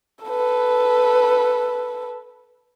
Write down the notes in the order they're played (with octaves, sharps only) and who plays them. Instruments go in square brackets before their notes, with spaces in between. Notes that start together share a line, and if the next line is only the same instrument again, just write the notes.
[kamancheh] A4 B4